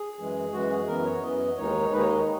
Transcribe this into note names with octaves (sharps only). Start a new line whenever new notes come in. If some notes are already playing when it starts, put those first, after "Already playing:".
Already playing: G#4
F#2 E3 G#3
F#2 E3 G#3 F#4
G#4
F#2 E3 B3 A#4
C#5
F#2 E3 B3 D#5
D#2 D#3 G#3 D#4 C#5
D#2 D#3 G#3 D#4 B4
C#5
D#5
C#5